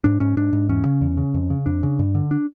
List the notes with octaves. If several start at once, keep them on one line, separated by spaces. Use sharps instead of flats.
G#2 D4
G#2 C#4
G#2 D4
G#2
E2 C#4
C#3
E2
C#3
F2
C#3
F2 D4
C#3
G2
D3
D4